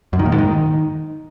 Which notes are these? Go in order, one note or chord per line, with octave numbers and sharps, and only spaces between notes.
F#2
D#3
A#2
G#2
D#3